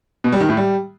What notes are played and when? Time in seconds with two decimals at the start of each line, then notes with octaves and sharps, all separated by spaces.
0.24 B2
0.32 G3
0.41 D#3
0.49 A2
0.57 G3